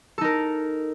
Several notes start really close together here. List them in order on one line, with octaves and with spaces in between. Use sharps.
A4 D#4 A#4